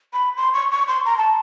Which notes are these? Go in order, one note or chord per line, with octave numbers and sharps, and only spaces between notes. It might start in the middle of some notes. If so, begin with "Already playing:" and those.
B5
C6
C#6
C#6
C6
A#5
A5